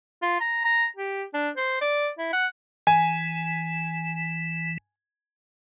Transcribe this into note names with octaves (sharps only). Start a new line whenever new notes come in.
F4
A#5
A#5
G4
D4
C5
D5
E4
F#5
E3 G#5